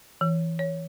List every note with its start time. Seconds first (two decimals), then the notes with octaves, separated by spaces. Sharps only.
0.21 E3
0.59 C#5